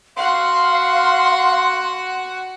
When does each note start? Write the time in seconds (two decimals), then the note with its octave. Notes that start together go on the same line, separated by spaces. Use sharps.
0.17 F#4 F5 F#5 C6